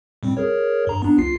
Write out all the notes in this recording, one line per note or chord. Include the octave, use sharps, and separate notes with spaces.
A2 G3 C4
G#4 A#4 C#5
G2 A#5
B3 D4
C2 F4 C7